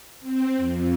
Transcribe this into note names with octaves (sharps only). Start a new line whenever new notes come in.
C4
F2